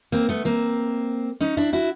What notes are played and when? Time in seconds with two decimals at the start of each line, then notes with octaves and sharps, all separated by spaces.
0.12 A#3 C4
0.29 A3 B3
0.45 A#3 C4
1.40 C#4 D#4
1.57 D4 E4
1.73 E4 F#4